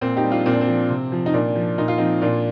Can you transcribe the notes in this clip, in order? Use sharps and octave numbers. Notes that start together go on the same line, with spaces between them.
A#2 C4
D#4 G4
G3
D4 F4
A#2 C4
D4
C4
F3
C3
F3
D#4
A#2 D4
F3
A#2 D#4
F4
F3 C4 D#4
A#2 D4 F4